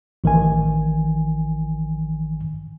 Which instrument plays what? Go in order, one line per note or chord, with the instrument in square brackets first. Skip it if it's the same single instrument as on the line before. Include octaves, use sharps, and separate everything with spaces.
[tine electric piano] A1 D#3 E3 G#5